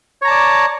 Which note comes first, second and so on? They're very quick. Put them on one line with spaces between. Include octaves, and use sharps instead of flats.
C#5 A#5 A5 D5